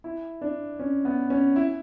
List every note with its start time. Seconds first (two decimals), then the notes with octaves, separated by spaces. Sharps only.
0.04 E4
0.42 D4
0.79 C#4
1.05 B3
1.30 C#4
1.56 E4